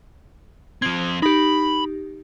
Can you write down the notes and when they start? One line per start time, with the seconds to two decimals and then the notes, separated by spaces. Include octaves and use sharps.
0.82 F3 C4 G#6
1.22 D#4 G4 B5